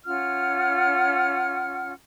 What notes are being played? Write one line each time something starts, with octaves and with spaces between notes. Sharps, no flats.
C#4 F4 F#5 F6